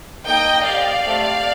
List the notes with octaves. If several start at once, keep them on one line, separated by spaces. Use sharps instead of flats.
A#3 D#4 A4 D#5 G5
C4 G4 D5 F5
A3 C4 G4